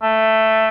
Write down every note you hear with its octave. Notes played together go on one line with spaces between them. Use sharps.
A3